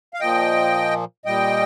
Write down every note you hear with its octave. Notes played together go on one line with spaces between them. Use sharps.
F5
A#2 F3 D#5 G5
A#2 G3 D#5 G5